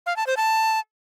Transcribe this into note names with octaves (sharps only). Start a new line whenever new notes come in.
F5
A5
C5
A5